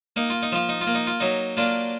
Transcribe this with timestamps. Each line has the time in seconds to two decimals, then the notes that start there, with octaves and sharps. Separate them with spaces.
0.16 A#3 D#4
0.30 F4
0.43 D#4
0.52 F3 F4
0.69 D#4
0.81 F4
0.87 A#3
0.95 D#4
1.07 F4
1.20 F#3 D#4
1.57 A#3 D4 F4